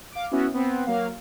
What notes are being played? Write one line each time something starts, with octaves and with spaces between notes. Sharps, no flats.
F5 D6
B3 C#4 E4 F#4
B3 C4
F#3 A#3 F5